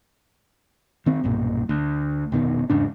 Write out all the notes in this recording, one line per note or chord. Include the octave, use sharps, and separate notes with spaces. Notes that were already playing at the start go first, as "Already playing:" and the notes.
D#3 C4
B1 G2 A#2
D2
F1 B2 D#3
E2 G#2 C#3 D4